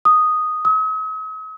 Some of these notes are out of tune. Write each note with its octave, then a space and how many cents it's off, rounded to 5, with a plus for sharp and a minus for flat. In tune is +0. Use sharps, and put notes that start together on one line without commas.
D#6 -5
D#6 +45